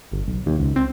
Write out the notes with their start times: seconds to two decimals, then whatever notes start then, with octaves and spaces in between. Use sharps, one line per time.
0.11 G1
0.28 B1
0.46 D#2
0.59 C#2
0.76 C4